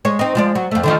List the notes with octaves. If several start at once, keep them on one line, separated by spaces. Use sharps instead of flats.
G#3 C#5
C4 D#4
F3 G#3 D5
F#3
F2 A3
D3 D#3 F3